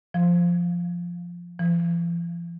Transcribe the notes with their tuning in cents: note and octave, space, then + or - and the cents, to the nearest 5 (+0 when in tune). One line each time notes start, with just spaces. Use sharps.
F3 -5
F3 -45